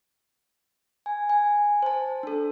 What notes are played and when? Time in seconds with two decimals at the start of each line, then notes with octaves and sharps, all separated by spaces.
1.06 G#5
1.30 G#5
1.83 C5 A5
2.23 D4 A4